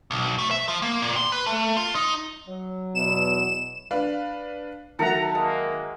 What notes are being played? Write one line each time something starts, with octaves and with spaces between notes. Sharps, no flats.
B1
A3
E5
F3
A#3
A#2
C6
B4
A3
F4
D#4
F#3
E2 B2 E7
D4 B4 F5
D#3 F#3 A4 E5 F#5 A#5
G#3 A#3